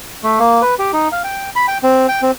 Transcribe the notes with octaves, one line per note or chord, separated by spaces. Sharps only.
A3
A#3
B4
G4
D#4
F5
G5
B5
G5
C4
G5
C4